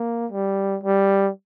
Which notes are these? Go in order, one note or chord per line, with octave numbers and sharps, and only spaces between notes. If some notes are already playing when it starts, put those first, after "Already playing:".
Already playing: A#3
G3
G3